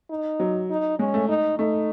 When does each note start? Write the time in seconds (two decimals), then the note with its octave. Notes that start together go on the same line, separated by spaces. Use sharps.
0.10 D#4
0.40 F#3
0.70 D#4
0.99 G#3 C#4
1.14 A3
1.29 D#4
1.58 A3 D#4